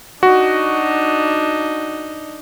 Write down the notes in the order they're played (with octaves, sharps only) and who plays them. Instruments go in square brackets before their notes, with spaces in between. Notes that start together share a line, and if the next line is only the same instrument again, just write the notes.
[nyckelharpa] D4 D#4 [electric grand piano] F#4